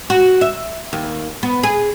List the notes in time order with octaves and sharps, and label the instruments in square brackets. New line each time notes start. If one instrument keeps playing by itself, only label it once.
[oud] F#4
E5
D#2
B3
G#4